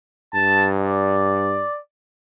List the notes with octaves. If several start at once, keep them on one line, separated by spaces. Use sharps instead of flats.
G2 A5
D5